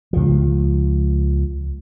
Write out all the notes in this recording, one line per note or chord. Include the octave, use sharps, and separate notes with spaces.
C#2 F3